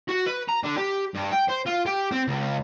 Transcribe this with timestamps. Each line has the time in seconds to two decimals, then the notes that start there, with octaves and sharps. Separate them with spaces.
0.08 F#4
0.26 B4
0.48 A#5
0.63 D3
0.77 G4
1.14 G2
1.31 G5
1.48 C5
1.66 F4
1.86 G4
2.12 C4
2.28 C#2